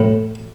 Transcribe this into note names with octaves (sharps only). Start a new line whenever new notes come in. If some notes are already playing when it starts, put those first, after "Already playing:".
Already playing: A2